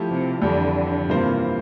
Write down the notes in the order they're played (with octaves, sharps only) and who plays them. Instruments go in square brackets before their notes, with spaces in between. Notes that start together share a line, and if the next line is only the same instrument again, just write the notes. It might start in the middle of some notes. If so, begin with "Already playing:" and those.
Already playing: [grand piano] F3 A3 E4 G4
[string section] C3
[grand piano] F2 E3 G3 [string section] D3
[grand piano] G2 E3 A#3 F4 C5 [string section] C3